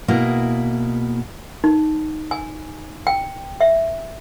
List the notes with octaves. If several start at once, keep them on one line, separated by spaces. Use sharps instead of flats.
B2 A#3 E4 G#4
D#4
G#5
G5
E5